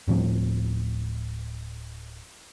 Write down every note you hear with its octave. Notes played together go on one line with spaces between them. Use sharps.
D1 A2 F3 C4